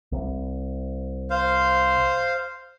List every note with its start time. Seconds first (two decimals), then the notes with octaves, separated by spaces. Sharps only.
0.12 C2
1.30 C5 F5